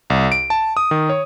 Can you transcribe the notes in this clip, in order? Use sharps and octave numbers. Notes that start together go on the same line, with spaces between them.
C2
D7
A5
D#6
D#3
C#5